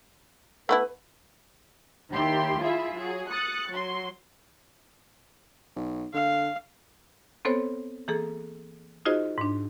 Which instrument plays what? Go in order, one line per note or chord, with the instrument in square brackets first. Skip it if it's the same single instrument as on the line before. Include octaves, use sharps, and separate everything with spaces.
[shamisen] A3 B3 E4 [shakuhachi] B4
[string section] D#2 E4 G4 C6
E4 F4 G#4 E5
F#3 G#4
D#6 F#6 A6 C#7
F#3 C6
[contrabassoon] B1
[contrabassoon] D3 [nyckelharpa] F5
[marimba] B3 C4 A4 C5 C#5
E3 A#3 G#4 A4
D#4 F4 F#4 G#4 C5 D#5
G#2 D4